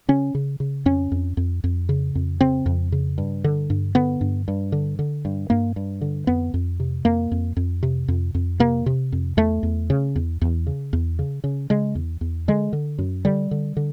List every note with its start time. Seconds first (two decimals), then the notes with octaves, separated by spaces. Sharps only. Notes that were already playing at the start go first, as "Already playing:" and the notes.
0.08 C#3 C#4
0.35 C#3
0.60 C#3
0.86 F2 C#4
1.12 F2
1.37 F2
1.64 F2
1.89 C#3
2.15 F2
2.41 C#3 C4
2.66 F2
2.92 C#3
3.18 G2
3.44 D3
3.70 G2
3.95 D3 B3
4.21 G2
4.48 G2
4.72 D3
4.99 D3
5.25 G2
5.50 G2 A#3
5.76 G2
6.01 D3
6.27 F2 B3
6.54 F2
6.80 C3
7.05 F2 A#3
7.31 F2
7.57 F2
7.83 C3
8.08 F2
8.35 F2
8.60 C3 A#3
8.86 C3
9.12 F2
9.37 E2 A3
9.63 E2
9.90 C#3
10.16 E2
10.41 E2
10.67 C#3
10.93 E2
11.19 C#3
11.44 C#3
11.70 C#3 G#3
11.95 E2
12.21 E2
12.48 D3 G#3
12.73 D3
12.98 F#2
13.25 D3 G3
13.51 D3
13.77 D3